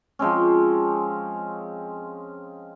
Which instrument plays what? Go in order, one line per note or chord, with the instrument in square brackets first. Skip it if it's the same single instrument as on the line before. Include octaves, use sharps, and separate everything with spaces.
[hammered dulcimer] F3 G#3 C4 C#4